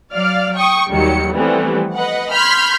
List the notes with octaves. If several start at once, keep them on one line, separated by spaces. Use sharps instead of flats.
F#3 D5 F5 F6
G5 C#6 D#6
D#2 D#3 F#3 G3 G4 C#7
E3 F3 G3 A3 B3 C4
B4 D#5 F#5
B5 C6 F6 G6 G#6 B6